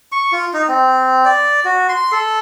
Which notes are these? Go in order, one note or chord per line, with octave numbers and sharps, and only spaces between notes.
C#6
F4
D#4
C4
D5
F#4
C6
A4